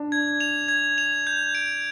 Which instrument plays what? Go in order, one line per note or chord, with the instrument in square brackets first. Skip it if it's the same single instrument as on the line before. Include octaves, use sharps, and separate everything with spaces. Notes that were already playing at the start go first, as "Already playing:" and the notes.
Already playing: [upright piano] D4
[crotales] G#6
F7
G#6
F7
G6
D7